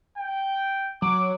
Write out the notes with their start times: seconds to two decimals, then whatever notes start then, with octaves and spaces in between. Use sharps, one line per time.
0.18 G5
1.02 F#3 D6